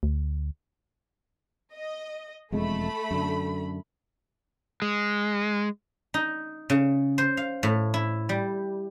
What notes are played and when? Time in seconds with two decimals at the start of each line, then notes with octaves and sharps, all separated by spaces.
0.03 D2
1.74 D#5
2.52 E1 F2 G#3 A3 B5
3.11 F#2 D3
4.82 G#3
6.14 D#4
6.70 C#3
7.18 C5
7.37 F5
7.63 A2
7.94 E4
8.29 G3